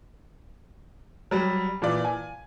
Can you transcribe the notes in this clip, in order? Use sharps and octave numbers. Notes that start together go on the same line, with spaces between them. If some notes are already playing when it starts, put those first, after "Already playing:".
F#3 G3
A#2 E3 D5
G#5